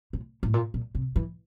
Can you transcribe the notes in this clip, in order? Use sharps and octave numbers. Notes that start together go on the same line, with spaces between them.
A2
A2
A#2
A#2
C3
E3